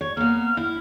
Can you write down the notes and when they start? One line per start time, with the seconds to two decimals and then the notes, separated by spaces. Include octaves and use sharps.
0.01 C#5
0.17 A#3 B3 F6
0.57 E4